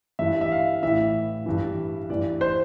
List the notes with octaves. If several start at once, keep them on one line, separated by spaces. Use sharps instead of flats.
G2 E3 E5
E5
F5
A2 E3 E5
G2 E3
G2 E3 D5
C5